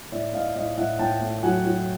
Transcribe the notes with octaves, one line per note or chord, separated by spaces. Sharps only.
A2 D5 E5
A2 D#5 F5
A2 D#5 F5
A2 E5 F#5
A2 G5 A5
A3
F#3 F#5 G#5
F#3